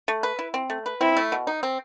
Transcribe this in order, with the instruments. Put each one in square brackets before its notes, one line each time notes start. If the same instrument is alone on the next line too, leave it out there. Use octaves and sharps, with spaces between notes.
[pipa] A3
B4
E4
C4
A3
B4
[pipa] C4 [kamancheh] E4
[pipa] A3
B2
D#4
C4